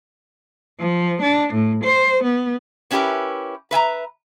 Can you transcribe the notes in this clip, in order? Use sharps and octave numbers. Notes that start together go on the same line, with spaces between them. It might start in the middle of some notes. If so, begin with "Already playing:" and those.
F3
D4
A2
C5
B3
B3 C#4 E4 G4 A#4 B4
B4 E5 G#5 A#5